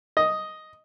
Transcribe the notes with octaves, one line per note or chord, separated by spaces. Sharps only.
D#5